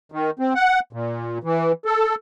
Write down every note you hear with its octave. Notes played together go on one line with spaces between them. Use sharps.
D#3
C4
F#5
A#2
E3
A4